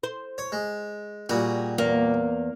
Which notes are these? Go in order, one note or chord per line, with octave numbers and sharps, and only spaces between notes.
C5
C#5
G#3
A#2 G3 F#4 G#4
E2 A#3